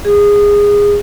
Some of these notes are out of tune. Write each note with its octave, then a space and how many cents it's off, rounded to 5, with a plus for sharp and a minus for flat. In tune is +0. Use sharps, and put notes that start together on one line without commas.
G#4 -20